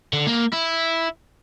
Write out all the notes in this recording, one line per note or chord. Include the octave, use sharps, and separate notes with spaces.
D3
A#3
E4